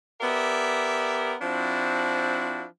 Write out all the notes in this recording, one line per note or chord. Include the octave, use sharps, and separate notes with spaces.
B3 G4 A#4 D5 E5
F3 C4 D4 E4 F#4